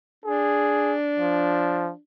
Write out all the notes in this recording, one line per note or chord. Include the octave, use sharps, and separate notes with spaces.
D4 G#4
F3